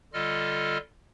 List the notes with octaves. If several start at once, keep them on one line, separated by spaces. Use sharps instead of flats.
D3 G3 F4 A4 D#5 F6